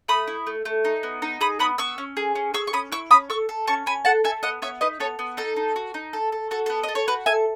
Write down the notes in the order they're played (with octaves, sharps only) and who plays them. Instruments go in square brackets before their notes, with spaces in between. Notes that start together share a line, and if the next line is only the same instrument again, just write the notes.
[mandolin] A3 B5 D#6
E4
A3
A3
D#4
B3
D#4
G#4 B5 D#6
B3 B5 D#6
B3 C#6 E6
C#4
G#4
C#4
G#4 C#6 E6
C#6
C#4 B5 D#6
E4 C#6 E6
C#4 B5 D#6
A4 C#6 E6
A4
C#4 A5 C#6
C#4 G#5 B5
A4 F#5 A5
A4 E5 G#5
B3 D#5 F#5
B3 C#5 E5
D#4 B4 D#5
B3 A4 C#5
B3
D#4 A4
D#4
F#4
D#4
A4
A4
F#4 A4
B3 A4
D#5
A4
C#5
F#4 B4
A4 E5 G#5